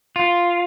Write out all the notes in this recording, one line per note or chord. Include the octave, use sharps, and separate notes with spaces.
F4